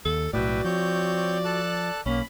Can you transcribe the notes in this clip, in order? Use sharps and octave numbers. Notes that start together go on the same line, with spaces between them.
D#2 A4
B1 A2 F#4 B4 D5 E5 G5
F3 C4 C#5 G6
A4 A5 F#6
B1 A#3 C#4 B5